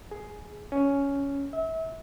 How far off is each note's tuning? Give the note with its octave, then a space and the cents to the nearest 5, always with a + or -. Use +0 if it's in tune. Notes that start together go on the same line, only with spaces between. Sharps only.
G#4 +10
C#4 +10
E5 -30